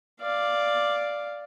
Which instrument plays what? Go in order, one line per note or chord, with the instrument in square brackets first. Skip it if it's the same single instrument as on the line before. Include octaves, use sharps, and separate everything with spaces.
[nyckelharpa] D5 F5